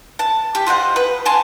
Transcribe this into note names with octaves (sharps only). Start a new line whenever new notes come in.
A5
G4
F4 C5 D#5 F#5
B4
F#5 G#5 A5 C6